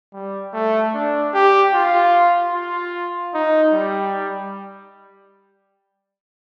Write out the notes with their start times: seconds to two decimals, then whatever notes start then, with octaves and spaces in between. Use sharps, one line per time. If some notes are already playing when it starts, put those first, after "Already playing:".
0.13 G3
0.53 A3
0.94 D4
1.34 G4
1.74 F4
2.54 F4
3.34 D#4
3.73 G3